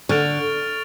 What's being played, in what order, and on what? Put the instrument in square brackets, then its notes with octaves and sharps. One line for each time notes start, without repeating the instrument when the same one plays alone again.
[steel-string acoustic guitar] D3 [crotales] C#6 F6 A6 D7 F7